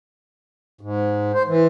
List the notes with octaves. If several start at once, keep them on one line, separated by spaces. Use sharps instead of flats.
G#2
C5
E3